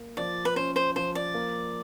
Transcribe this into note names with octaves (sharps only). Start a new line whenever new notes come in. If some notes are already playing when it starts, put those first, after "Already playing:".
Already playing: A#3
F3 D5
B4
C#4 C5
C5
F3 C5
D5
A#3